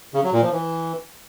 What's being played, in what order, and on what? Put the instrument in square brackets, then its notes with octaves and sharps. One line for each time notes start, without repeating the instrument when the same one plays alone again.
[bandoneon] C#3
F#3
A#2
F3
E3